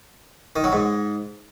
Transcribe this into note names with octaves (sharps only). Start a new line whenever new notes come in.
D#3
F#3
G#2